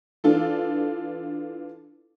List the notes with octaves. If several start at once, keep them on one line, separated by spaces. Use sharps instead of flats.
E3 D4 F4 A4